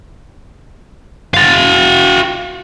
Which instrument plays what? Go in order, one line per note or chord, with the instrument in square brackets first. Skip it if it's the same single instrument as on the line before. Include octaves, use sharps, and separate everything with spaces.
[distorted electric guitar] F#4 F5